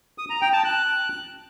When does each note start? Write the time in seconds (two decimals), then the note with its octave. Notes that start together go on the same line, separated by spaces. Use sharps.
0.18 D#6
0.30 A#5
0.41 G5
0.53 A5
0.65 F#6